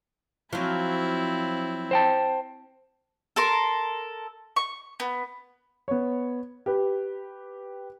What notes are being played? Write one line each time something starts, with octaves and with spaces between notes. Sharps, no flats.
F3 F#3 C4 E4
C5 G5 A5
A4 A#4 C6
C#6
B3
B3 C#5
G4 B4